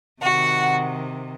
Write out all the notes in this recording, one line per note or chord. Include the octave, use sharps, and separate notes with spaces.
C3 D#3 F#4 F#5